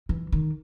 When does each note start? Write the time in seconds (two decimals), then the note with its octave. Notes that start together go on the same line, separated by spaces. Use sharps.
0.09 E3
0.32 D#3